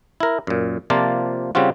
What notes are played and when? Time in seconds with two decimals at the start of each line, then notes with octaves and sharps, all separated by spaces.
0.20 E4 A#4
0.47 F#2 A#2
0.90 C3 F3 A#3 F4 D5 A5
1.55 C#3 G3 C4 F4 F#4